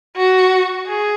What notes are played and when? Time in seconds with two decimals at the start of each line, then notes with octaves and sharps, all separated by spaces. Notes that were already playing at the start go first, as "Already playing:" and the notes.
0.16 F#4
0.86 G#4